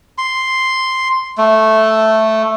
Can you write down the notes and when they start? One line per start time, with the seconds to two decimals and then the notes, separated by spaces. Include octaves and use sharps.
0.18 C6
1.38 A3